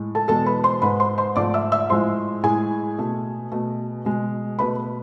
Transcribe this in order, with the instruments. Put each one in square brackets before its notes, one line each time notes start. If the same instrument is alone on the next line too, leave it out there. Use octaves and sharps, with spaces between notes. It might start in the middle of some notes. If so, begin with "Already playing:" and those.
Already playing: [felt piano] A2 G#3
A4 A5
E2 B2 G#3 A4 A5
B4 B5
C5 C6
G#2 G#3 B4 B5
C5 C6
C5 C6
G#2 F3 A3 D5 D6
E5 E6
E5 E6
A2 F3 G#3 C5 C6
A2 G#3 G#4 G#5
B2 A3
B2 A3
B2 G#3
B2 A3 B4 B5